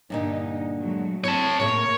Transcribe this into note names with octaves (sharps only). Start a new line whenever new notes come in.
G2 A#2 D3 D#4
F#3 G#3 A3
C4 E4 A4 C#5 A5
A2 C#3 A3 A#3 A#4 C#5